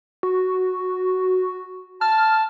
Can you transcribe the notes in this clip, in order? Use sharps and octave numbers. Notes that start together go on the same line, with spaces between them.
F#4
A5 F6